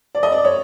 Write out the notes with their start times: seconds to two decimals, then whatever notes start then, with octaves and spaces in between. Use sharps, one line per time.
0.15 D5
0.23 D#5
0.32 D5
0.45 C#5